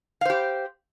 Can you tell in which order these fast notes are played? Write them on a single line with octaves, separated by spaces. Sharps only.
F5 C5 G4